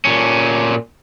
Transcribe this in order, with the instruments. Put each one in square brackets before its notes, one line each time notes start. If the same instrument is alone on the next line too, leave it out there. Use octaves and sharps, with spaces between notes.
[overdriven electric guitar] A#2 C#4